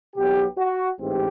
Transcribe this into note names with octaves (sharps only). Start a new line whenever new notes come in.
B1 B2 F#3 B3 G4
F#4
A1 G#2 E3 C4 G4